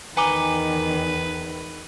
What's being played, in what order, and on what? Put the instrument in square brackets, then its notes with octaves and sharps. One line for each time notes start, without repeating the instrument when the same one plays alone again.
[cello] E2 D#3 [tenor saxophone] B4 [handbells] G#5 A#5 D6